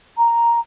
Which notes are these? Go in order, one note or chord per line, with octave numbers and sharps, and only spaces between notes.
A#5